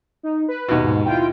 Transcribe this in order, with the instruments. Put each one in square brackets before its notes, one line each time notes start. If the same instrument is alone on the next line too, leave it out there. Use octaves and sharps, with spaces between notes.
[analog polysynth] D#4
B4
[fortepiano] D#2 B2
[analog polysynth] G#2
E4 F4 G5